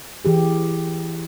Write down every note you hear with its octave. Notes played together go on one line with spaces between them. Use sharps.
E3 G4 G#4